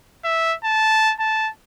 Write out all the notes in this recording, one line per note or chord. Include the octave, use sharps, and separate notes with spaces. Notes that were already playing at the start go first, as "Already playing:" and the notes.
E5
A5
A5